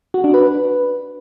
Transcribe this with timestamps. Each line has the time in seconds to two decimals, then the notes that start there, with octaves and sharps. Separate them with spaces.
0.14 F#4
0.24 D4
0.34 B4